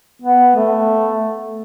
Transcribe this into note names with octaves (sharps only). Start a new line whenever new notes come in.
B3
A3